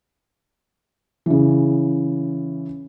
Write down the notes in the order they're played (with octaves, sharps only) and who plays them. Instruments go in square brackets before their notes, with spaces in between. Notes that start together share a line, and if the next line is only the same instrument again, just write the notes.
[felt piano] C#3 E3